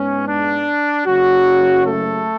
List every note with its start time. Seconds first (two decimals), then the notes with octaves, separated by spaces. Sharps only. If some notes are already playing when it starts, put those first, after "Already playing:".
Already playing: G#2 G#3 B3 C#4
0.26 D4
1.06 F#1 F#2 C#3 F#3 F#4
1.85 A3 A4